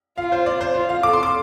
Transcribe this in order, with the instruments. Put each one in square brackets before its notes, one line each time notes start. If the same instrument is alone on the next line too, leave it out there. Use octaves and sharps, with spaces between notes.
[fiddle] F4 [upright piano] F5
[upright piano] C5
D5
C5
[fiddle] F4 [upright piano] C5
[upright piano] F5
[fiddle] A4 [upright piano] D6
[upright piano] C6
D6